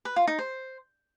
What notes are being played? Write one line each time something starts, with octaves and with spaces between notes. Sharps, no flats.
B4
F4
D#4
C5